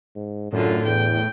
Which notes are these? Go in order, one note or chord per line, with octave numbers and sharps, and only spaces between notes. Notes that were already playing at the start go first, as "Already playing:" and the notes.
G#2
F#2 A2 D3 F4
E2 G5